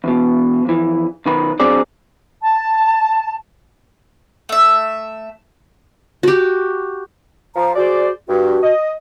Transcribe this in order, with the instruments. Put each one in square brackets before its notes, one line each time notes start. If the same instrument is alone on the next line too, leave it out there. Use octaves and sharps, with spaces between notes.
[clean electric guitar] E2 B2
F2 E3
B1 D#3 B4
F#3 C4 D4 G#4 D5
[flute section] A5
[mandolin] A3 E5
[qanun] F#4 G4
[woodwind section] F3 [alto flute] A#5
[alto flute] F#4 [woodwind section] G#4 C5 D5
[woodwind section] G2 [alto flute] F#4
[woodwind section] D#5